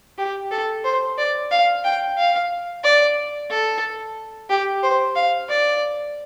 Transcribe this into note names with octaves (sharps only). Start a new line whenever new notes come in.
G4
A4
C5
D5
F5
G5
F5
D5
A4
G4
C5
F5
D5